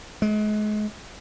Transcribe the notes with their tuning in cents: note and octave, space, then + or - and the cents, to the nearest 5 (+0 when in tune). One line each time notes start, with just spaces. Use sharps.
G#3 +35